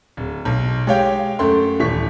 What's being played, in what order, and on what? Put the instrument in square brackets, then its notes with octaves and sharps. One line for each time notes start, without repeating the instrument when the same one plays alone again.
[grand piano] D1
B1
G#3 G4 C#5 F5 G5
F#2 A3 C6
D#1 E3 C#6 B6